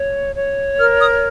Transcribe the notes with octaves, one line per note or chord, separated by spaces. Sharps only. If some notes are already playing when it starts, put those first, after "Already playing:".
Already playing: C#5
C#5
A#4 F6
D#6